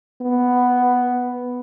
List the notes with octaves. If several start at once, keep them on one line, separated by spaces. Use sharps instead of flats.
B3